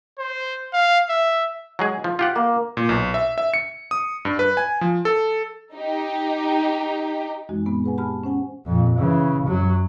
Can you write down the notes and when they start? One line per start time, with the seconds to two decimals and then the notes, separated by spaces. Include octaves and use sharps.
0.18 C5
0.73 F5
1.09 E5
1.79 F#3 G#3 G#4
2.04 F3
2.19 F4 G4 F#5
2.35 A#3
2.77 A#2
2.89 B1
3.14 E5
3.38 E5
3.54 C#7
3.91 D#6
4.25 G2
4.39 B4
4.57 G#5
4.81 F3
5.05 A4
5.74 D#4 G4
7.49 F#2 E3 G#3 C4 D#4 F#4
7.66 A#2 G#3 B3 B5
7.84 G#4 B4 F#5 G#5
7.98 G4 A5 B5 F6
8.24 C#4 C5 F#5 G#5
8.66 F2 A#2
8.97 C#3 E3
9.46 F#2 F#3